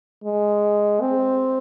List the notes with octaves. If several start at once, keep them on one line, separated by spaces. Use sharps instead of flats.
G#3
C4